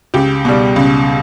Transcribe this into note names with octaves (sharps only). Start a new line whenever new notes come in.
C#2 G4
B2 G3
C#2